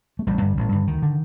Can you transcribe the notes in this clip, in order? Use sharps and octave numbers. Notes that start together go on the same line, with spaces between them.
A3
A1 G3
G2 D3
A1
G2 D3
D2 D#3
D3